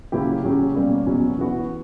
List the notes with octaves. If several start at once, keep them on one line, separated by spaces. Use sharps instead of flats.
C#3 F#3 A#3 E4 G4
C#3 F#3 C#4 G4
B2 G3 A#3 C#4
E2 B2 F#3 C#4
E3 B3 F#4